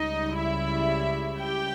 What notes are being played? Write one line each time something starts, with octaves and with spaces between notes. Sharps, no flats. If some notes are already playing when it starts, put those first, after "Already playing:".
Already playing: C#2 C#3 G3 D#4 D#5
E4 E5
G4 G5